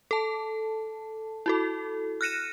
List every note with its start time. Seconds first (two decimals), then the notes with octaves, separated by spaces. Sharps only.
0.11 A4 A5
1.46 E4 F#4 A4
2.21 F6 F#6 A#6 C#7 D#7 E7